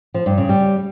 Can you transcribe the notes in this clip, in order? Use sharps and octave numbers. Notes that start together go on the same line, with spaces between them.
F3
G2
C#3
G3